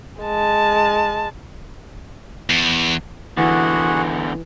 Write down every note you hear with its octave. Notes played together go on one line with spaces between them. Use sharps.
G#3 A5
E2
E2 D3 E3 F#4 G#4 F#5